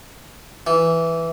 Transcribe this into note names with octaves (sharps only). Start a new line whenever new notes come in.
E3